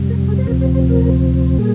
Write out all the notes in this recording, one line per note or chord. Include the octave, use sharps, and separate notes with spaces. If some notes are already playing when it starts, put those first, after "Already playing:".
Already playing: F2 C3 G3
A#4
G#4
C5
D2 C3 F3 C4 A#4
C5
C5
A#4
A#2 G3 A#3 G#4